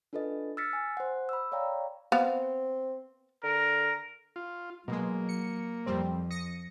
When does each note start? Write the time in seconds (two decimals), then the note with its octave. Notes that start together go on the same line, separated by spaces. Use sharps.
0.13 D4 F4 A4 B4 D#5
0.57 E6 F6 A6 B6 C#7
0.73 G#5
0.97 C5 F#5
1.29 B5 E6
1.52 C#5 D5 F5 G5 A#5
2.12 B3 C4 F5
3.43 D3 A#4
4.36 F4
4.88 B2 F#3 G#3 A#3
5.29 C#7
5.86 F2 G3 C4
6.30 D#6 A#6 C#7